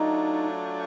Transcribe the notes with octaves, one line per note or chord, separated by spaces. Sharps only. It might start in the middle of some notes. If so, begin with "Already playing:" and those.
Already playing: F#3 A3 D4 D#4 F4